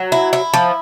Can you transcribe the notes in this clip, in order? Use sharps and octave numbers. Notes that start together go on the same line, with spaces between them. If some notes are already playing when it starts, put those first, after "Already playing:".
Already playing: F#3
E4
E4
F3